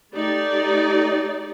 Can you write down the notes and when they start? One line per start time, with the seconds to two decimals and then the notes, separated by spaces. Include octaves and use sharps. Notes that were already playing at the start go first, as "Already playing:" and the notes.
0.11 A3 D#4 G4 D5